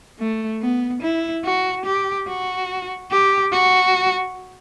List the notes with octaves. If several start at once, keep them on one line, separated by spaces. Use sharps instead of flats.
A3
B3
E4
F#4
G4
F#4
G4
F#4